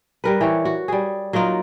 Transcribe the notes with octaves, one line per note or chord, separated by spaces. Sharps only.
G3 A#4 B4
E3 G4 C#5
F#4
G3 G#4
F#3 A#3 D#4 F4